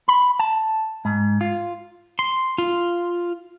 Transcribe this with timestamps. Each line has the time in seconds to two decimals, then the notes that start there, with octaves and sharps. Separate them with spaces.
0.08 B5
0.39 A5
1.05 G#2
1.41 F4
2.19 C6
2.58 F4